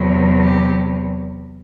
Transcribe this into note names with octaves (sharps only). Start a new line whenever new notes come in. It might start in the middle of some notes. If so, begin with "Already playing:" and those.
Already playing: E2 C3 F#3
G4